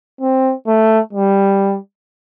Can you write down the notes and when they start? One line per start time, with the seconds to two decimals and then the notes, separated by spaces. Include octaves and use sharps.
0.21 C4
0.67 A3
1.13 G3